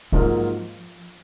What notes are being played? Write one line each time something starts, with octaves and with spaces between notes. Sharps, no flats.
G#2 F3 F#3 A#3 F4 A#4